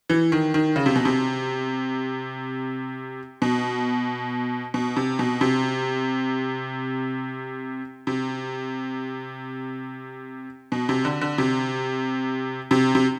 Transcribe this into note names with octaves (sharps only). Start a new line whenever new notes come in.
E3
D#3
D#3
C#3
C3
B2
C3
B2
B2
C3
B2
C3
C3
B2
C3
D3
D3
C3
C3
C3